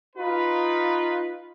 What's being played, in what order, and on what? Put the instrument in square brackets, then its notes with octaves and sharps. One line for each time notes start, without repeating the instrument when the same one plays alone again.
[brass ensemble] D#4 F4 B4